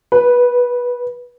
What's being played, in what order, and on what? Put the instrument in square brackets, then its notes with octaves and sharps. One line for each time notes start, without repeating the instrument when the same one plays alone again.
[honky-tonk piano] B4